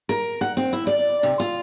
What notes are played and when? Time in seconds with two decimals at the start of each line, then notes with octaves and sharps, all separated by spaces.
0.09 A#4
0.41 F#5
0.57 C4
0.73 E4
0.87 D5
1.23 C3
1.40 F4